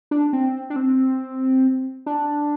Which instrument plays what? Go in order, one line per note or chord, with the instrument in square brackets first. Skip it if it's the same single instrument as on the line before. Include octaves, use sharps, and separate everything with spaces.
[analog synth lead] D4
C4
D4
C4
D4